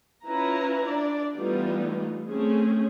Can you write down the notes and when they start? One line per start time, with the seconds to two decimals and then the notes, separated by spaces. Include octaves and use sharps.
0.24 C#4 E4 F4 B4 A#5
0.85 D4 D5
1.36 E3 G3 A3 B3 D#4 F4
2.29 A3 C4 C#4 G#4